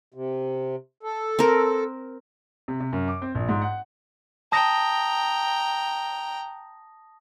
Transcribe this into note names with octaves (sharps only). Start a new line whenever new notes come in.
C3
A4
C4 A#4
C3
C3
F#2
D6
C4
A#1
G#2
F#5
G5 A5 A#5 D#6 A#6